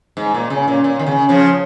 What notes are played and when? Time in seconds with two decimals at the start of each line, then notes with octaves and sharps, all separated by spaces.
0.17 G#2
0.34 A#2
0.50 C#3
0.68 A#2
0.84 A#2
0.99 D#3
1.07 C#3
1.29 C#3 F3